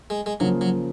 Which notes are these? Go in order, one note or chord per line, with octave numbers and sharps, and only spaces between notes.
G#3
G#3
C#3 F3 F#3 A#3
F#3